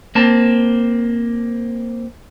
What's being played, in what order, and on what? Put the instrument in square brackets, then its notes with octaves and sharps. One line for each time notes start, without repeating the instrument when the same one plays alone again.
[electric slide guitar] A#3 C4 A5